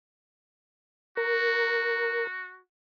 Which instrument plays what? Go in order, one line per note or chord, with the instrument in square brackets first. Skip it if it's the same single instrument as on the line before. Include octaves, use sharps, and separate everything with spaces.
[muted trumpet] F#4 [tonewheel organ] A#4